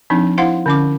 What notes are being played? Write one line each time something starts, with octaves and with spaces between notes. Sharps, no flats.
F3 C4 D4 D#4
E4 C5 F5 F#5 C6
D3 C#4 D6